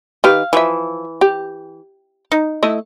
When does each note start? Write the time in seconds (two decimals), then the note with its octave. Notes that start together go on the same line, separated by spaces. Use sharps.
0.24 D#3 G4 B4 F5
0.53 E3 F3 E5
1.21 G4
2.32 D#4
2.63 A3 E4 D#5